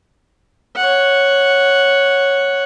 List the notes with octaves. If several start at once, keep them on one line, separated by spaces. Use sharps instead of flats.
C#5 F#5